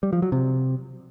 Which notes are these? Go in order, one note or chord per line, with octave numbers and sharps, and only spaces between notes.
G3
F3
F#3
C3